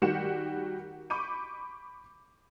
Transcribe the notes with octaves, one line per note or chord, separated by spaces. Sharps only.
D#3 G3 F#4 G4 C#7 E7
B5 C#6 D6 G6 D#7